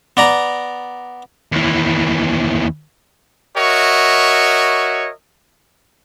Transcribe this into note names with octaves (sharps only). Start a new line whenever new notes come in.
B3 D5 A#5
D#2 E3
F#4 A#4 C#5 D#5 E5